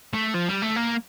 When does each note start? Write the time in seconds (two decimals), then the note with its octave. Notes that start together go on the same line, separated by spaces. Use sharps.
0.14 A3
0.34 F3
0.49 G3
0.62 A3
0.76 A#3